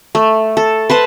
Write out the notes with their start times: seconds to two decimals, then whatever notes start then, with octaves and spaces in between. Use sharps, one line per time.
0.15 A3
0.57 A4
0.90 B4 C5 A5